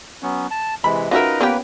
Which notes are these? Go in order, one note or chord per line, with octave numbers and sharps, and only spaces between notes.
F#3 B3 C#4
A5
C3 E3 G#3 B5
C#4 D#4 F4 F#4 A#4 B4 D#5 E5
A#3 B3 C#4 G4 B4